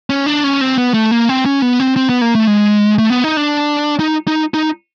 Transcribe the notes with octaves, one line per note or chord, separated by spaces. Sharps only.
C#4
D4
C#4
C4
B3
A3
A#3
C4
C#4
B3
C4
C4
B3
A#3
A3
G#3
A3
B3
D#4
D4
D#4
D#4
D#4